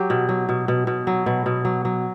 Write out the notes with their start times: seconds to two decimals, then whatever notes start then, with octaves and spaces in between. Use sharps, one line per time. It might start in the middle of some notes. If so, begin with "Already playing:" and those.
Already playing: F#3 G4
0.10 B2
0.29 F#3
0.49 B2
0.68 B2
0.87 B2
1.07 F#3
1.26 B2
1.46 B2
1.65 F#3
1.85 F#3